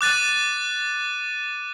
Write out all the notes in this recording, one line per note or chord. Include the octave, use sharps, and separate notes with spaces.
D6 F#6 A6 D#7